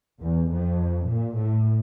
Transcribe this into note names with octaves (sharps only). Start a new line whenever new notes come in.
E2
F2
A#2
A2